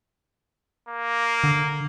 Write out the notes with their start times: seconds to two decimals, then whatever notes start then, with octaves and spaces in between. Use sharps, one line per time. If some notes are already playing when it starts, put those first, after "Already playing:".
0.89 A#3
1.44 D3